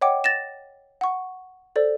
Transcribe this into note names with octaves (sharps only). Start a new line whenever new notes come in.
C#5 D#5 F#5 G5 D6
A6 A#6 E7
F#5 C#6
A4 C5 D5